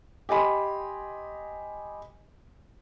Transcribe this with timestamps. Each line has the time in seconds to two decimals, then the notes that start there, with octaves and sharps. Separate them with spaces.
0.29 G4 D#5 G#5 B5 C6